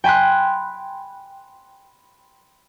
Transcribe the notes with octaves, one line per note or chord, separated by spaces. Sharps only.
G5 G#5 B5 C6 F#6